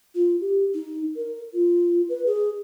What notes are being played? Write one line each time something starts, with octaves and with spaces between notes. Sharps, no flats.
F4
G4
D#4
A#4
F4
B4
G#4